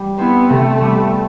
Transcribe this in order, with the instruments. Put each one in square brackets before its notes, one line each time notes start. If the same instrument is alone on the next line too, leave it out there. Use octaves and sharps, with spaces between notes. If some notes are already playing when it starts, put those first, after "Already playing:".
Already playing: [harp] G3
[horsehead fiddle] B3 [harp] C4 E4
[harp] C3 [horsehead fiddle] A3
[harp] G3 B3